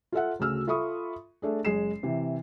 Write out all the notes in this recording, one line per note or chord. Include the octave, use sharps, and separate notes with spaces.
F4 A4 E5 F#5
D2 C#3 F#4 E6 F6
F4 A4 E5 B5 C#6 D#6
A3 D4 G#4
F#1 G#3 G#4 C7 E7
C3 E3